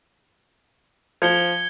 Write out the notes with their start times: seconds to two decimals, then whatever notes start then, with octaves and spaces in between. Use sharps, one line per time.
1.22 F3 G#6 C#7 G7